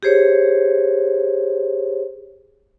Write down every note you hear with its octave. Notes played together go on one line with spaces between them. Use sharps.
G4 G#4 C5 C#5